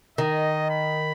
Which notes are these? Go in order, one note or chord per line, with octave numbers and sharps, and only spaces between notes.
D#3 D#5
B5